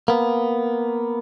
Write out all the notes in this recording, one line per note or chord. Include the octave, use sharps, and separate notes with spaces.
A#3 B3